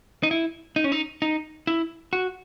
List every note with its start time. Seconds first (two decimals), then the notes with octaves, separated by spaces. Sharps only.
0.23 D#4
0.31 E4
0.76 D#4
0.84 C#4
0.92 D#4
1.22 D#4
1.67 E4
2.13 F#4